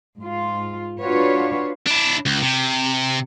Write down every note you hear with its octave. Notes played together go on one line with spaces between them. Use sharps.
G#2 F4
D4 F4 F#4 B4 C#5
D4 E4
C#2
C3